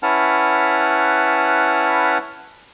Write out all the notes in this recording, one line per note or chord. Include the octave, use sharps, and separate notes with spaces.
C#4 E4 B4 F#5 A5 F6